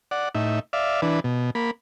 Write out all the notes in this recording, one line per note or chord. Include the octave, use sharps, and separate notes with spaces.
D5 F#5
A2 D#4 E5
D5 E5 F5
E3 D4 B4
B2
A#3 B5